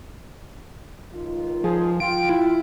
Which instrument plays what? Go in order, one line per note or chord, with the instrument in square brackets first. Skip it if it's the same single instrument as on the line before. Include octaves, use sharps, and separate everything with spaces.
[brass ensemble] C#2 D#3 F4
[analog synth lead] F3 [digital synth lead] G#4
[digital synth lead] F4 [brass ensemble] G5 [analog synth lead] D7
[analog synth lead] E4